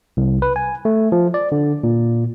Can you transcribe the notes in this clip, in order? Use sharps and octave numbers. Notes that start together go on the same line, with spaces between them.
C2
B4
G#5
A3
F3
D5
D3
A#2